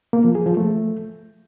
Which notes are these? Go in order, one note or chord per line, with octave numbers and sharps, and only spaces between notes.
A#3
F3
G#4
F3
A3